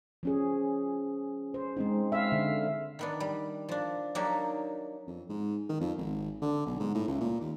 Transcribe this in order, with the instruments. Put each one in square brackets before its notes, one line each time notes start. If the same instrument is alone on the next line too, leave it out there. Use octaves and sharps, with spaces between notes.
[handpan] F3 C#4 G#4
C5
G#3 C4 D#4
E5 F5
D3
[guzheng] D#3 B3 D4
G3
F3 D4
F#3 A#3 D4 D#4 G4
[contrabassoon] F2
G#2
D#3
F2
G#1
D3
B1
G#2
A2
C#2
A#2
D#2